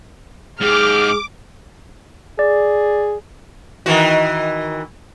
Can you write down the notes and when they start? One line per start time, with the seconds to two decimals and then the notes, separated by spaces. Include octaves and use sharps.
0.61 G#2 G4 G#4 D6 F6
2.39 G#4 D5
3.86 D#3 E3 F#4